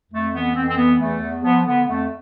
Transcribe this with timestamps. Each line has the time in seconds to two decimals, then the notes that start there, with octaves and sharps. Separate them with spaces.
0.11 F2 A3
0.34 E3 B3
0.56 F2 C4
0.68 C4
0.78 E3 B3
0.99 E2 A3
1.22 E2
1.44 F3 B3
1.66 D3 B3
1.88 F2 A3